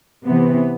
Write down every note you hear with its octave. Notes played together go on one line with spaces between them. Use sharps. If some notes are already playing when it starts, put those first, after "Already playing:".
C3 E3 B3